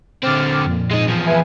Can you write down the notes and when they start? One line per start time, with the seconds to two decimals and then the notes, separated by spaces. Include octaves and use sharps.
0.23 D3 C4 D6 F6 A6
0.65 F2 A#2
0.91 G#3 D#4
1.08 E2 F3
1.26 B4 E5 G#5